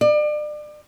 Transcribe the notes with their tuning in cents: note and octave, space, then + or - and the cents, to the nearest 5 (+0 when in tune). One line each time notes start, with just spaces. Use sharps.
D5 +35